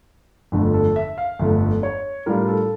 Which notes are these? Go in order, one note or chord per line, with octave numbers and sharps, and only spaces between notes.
G1 F2 D3 A3
A4
E5
F5
G1 F2 D3 A3 E5
C#5
A2 G3 D4 F4 A#4
A4